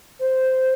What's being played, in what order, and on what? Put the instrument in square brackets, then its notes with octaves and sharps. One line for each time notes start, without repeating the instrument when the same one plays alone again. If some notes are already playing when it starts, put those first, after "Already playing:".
[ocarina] C5